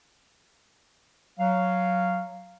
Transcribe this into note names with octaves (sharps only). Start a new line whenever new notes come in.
F#3 F5